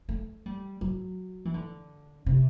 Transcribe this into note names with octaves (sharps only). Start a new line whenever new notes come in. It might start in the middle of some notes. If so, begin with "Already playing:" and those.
A3
G3
F#3
E3
D3
C3